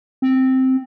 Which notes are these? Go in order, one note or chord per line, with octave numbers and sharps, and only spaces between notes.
C4